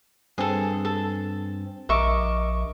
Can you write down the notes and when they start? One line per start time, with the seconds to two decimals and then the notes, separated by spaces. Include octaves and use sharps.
0.38 G2 C4 G#4 A4
0.85 A4
1.89 A#1 A#4 D#5 E5 C#6 D6